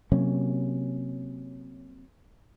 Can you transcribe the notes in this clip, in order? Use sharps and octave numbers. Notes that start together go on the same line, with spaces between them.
C3 F#3 A#3 C#4